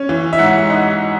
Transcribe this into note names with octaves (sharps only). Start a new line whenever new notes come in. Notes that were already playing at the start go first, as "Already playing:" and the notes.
Already playing: C#4
E3
E5
G#2 F#5
D#4 F#5